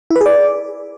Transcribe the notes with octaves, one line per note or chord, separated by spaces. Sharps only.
E4
B4
G#4
D5